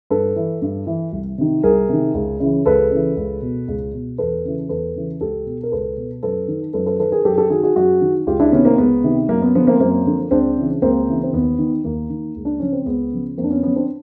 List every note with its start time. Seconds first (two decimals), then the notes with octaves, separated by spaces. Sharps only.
0.10 G2 A4 B4
0.36 E3
0.62 G2
0.87 E3
1.13 C2
1.38 C3 D#3
1.63 C2 G#4 A#4
1.89 C3 D#3
2.14 C#2
2.40 C#3 E3
2.66 C#2 A4 B4
2.91 C#3 E3
3.17 C#2
3.42 B2
3.68 C#2
3.94 B2
4.18 E2 A4 B4
4.45 C#3 E3
4.69 E2 A4 B4
4.95 C#3 E3
5.21 C#2 G4 A4
5.46 B2
5.63 A#4
5.72 C#2 A4 B4
5.97 B2
6.23 F#2 A4 B4
6.48 D#3
6.73 F#2 A4 B4
6.86 A4 B4
6.99 D#3 A4 B4
7.12 G#4 A#4
7.25 F#2 G4 A4
7.34 G#4
7.38 G4 A4
7.50 D#3 F#4 G#4
7.63 F#4 G#4
7.76 F#2 F#4 G#4
8.01 D#3
8.27 C#2 F4 G4
8.40 D4 E4
8.52 C3 D#3 B3 C#4
8.65 A#3 C4
8.78 C#2 B3
9.04 C3 D#3
9.29 F#2 A#3
9.42 B3
9.55 D3 F3 B3
9.67 A#3 C4
9.80 F#2 A#3 C4
10.06 D3 F3
10.31 C#2 C4 D4
10.57 C#3 E3
10.82 C#2 A#3 C4
11.08 C#3 E3
11.23 C4
11.33 D#2 B3
11.59 D#3
11.84 D#2 A#3
12.10 D#3
12.36 C#2
12.45 D4
12.59 C#3 F3 C#4
12.72 C4
12.86 C#2 B3
13.12 C#3 F3
13.38 F2 A#3 C4
13.44 D4
13.50 B3 C#4
13.62 D3 F3 B3 C#4
13.76 C4 D4